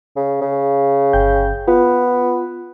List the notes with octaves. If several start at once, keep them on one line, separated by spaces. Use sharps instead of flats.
C#3
C#3
G1 G5 G6
B3 F4